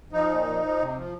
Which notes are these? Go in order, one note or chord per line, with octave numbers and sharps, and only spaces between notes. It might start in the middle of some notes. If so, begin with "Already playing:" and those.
F3 D#4
A#2
F3
F3
C3
F3